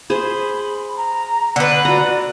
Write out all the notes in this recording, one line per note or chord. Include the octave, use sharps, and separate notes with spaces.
G#4 C5 B5
A#5
D3 B4 D5
F#4 A#5